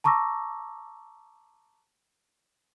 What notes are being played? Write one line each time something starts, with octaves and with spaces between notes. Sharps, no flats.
A5 A#5 C#6 D6 E6 A#6